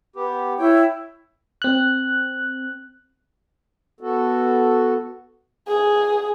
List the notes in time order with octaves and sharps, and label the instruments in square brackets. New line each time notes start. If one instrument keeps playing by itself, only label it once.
[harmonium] B3 G4
[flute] E4 [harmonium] C#5 G5
[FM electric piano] C4 F#6
[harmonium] B3 F#4 A4
[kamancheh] G#4